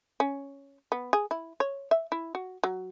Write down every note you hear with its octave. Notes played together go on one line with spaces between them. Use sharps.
C#4
B3
G#4
E4
C#5
E5
E4
F#4
F#3